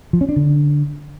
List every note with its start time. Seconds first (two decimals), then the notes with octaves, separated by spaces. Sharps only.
0.13 F3
0.21 C#4
0.29 D4
0.36 D3